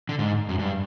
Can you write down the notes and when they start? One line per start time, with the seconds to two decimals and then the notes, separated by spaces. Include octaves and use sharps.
0.09 D3
0.19 G#2
0.49 F#2
0.59 G2